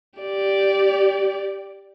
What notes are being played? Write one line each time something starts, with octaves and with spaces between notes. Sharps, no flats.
G4 D5